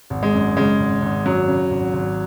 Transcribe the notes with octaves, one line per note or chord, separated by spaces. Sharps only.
G#1
G#3
F#2
C#3 G#3
G#1
G#1
F#2 F#3
C#3
G#1
G#1